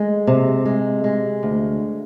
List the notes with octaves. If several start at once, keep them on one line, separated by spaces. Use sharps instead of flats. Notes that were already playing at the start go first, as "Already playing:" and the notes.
Already playing: G#3
C3
G#3
G#3
D2